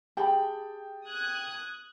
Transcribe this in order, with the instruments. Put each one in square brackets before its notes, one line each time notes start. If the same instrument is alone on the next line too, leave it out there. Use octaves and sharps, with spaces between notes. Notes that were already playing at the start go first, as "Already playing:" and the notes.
[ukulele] G4 B5 [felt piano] G#4 G5 A5
[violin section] D#6 F#6 G#6